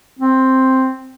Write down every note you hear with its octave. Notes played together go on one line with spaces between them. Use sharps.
C4